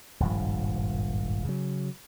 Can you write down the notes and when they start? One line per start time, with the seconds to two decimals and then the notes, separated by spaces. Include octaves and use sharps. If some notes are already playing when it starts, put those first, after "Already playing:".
0.20 D#1 G#1 G2 F3
1.45 C#3 F#3